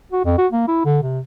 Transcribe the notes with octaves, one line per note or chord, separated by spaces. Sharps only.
F#4
F2
F#4
A#3
E4
D3
C3